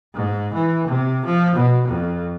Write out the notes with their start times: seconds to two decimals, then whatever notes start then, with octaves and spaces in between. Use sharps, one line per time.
0.15 G#2
0.53 E3
0.87 C3
1.25 F3
1.56 B2
1.87 F2